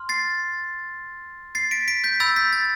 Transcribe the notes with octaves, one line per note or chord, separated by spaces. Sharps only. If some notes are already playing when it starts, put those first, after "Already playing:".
Already playing: C6 F6
A6 C7
A6 C7
B6 D7
B6 D7
G6 B6
B5 E6 G6 A6
G6 B6
A6